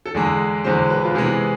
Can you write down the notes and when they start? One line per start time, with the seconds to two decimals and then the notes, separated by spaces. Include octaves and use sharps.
0.06 A4
0.14 E2 D3 G#3 G#4
0.64 E2 D3 G#3 C5
0.90 B4
1.05 F4
1.15 C3 E3 G#3 B3 G#4